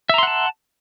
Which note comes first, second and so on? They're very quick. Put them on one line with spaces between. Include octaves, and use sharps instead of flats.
E5 A#5 C6 F#5 A5